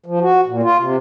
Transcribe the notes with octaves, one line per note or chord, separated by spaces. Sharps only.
F3
F#4
A#2
F4
C3